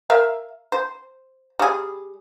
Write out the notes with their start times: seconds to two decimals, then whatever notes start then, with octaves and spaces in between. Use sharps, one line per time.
0.10 A#4 E5 F5
0.72 C5
1.59 G3 G#4